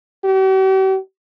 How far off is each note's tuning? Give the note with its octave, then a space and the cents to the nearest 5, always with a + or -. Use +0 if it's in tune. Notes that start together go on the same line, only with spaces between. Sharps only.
G4 -45